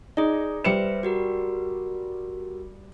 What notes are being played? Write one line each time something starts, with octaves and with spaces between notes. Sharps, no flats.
D#4 G#4 D5
G3 B4 C5 E5 C#7 E7
F#4 G4 A#4